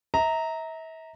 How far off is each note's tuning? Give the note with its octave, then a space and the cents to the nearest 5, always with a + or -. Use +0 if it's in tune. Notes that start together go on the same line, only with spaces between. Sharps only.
E5 -40 A#5 -10